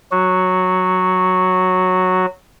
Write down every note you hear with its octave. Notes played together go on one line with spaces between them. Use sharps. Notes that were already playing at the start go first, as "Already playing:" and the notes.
F#3 F#4